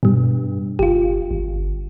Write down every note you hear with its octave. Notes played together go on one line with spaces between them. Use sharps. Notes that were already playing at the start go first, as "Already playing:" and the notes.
G2 B2 G3
F#1 F4 G4
G1